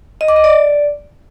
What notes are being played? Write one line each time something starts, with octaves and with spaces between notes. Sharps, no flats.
D#5
D6
D#5
D5